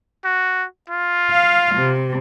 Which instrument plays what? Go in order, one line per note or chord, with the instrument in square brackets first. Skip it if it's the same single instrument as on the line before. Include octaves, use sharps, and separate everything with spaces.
[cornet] F#4
F4
[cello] F5
C3